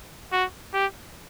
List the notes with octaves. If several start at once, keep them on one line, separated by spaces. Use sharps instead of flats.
F#4
G4